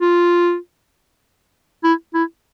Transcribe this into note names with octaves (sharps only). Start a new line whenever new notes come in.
F4
E4
E4